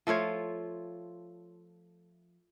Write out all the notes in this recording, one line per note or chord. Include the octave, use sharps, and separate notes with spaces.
F3 A3 F4 C#5